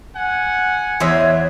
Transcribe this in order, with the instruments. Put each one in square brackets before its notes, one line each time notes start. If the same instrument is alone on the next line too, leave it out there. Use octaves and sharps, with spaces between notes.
[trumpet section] F#5 G#5
[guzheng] E2 [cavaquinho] C5 D#5 E5 [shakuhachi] C#5